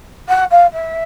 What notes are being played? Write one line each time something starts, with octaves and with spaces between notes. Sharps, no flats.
F#5
F5
E5